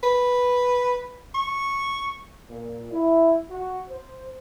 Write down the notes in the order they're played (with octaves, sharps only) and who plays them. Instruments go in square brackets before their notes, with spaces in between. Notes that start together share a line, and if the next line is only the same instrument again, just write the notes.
[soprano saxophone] B4
C#6
[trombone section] A#2
E4
F#4
C5